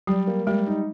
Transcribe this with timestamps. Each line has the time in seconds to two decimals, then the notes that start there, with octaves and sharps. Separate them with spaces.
0.07 F#3 G3
0.27 A#3
0.47 G3 G#3
0.67 D#4